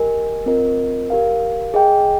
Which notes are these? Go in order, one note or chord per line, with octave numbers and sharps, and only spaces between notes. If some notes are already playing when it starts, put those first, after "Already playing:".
Already playing: G4 A#4 D#5 G#5
C4 F4 A#4 D#5
G4 A#4 F5
G#4 D#5 G5